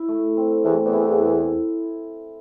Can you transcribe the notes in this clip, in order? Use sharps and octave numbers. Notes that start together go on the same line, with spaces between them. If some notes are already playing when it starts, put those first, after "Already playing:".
Already playing: E4
A3
C4
E2 A3
E2
E4